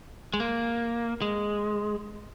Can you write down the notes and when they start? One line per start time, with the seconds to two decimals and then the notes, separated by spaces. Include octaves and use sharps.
0.34 G#3
0.40 A#3
1.22 G#3